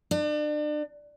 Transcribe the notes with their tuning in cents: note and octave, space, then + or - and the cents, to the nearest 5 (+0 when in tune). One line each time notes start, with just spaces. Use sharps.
D4 +35